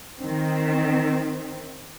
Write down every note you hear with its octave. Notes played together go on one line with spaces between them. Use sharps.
D#3 C4